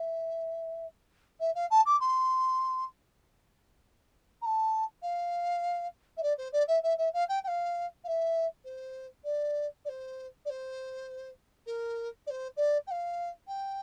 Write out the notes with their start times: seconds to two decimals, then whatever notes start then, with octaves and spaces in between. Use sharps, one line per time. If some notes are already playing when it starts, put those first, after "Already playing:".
Already playing: E5
1.40 E5
1.55 F5
1.70 A5
1.85 D6
2.00 C6
4.41 A#5
4.45 A5
5.02 F5
6.17 E5
6.22 D5
6.38 C5
6.52 D5
6.68 E5
6.83 E5
6.98 E5
7.13 F5
7.28 G5
7.43 G5
7.47 F5
8.04 F5
8.07 E5
8.64 C5
9.24 D5
9.85 D5
9.89 C5
10.45 D5
10.49 C5
11.66 A#4
12.26 D5
12.30 C5
12.56 D5
12.86 G5
12.90 F5
13.47 G5